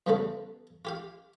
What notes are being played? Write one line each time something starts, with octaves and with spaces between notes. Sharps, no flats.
E2 G2 C#3 A3 B3 A4
F4 G4 F5